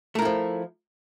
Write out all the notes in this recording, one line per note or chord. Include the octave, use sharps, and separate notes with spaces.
F3 A3 E4 A#4